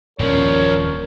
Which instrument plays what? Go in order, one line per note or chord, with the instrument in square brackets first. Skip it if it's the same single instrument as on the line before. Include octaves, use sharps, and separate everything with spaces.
[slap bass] D#1 C#4 [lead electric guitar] G2 F3 [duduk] A#4 [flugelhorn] C#5